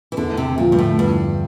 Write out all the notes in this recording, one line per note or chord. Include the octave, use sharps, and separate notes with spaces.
E3
E2 D3
C3
A#2 D3 F3
G2
A2
E2 G2